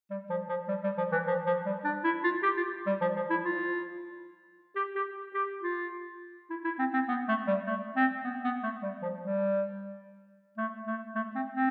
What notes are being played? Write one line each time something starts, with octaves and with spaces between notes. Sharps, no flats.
G3
F3
F3
G3
G3
F3
E3
F3
F3
G3
D4
E4
F4
G4
F4
G3
F3
F3
E4
F4
G4
G4
G4
F4
E4
E4
C4
C4
B3
A3
G3
A3
C4
B3
B3
A3
G3
F3
G3
A3
A3
A3
C4
C4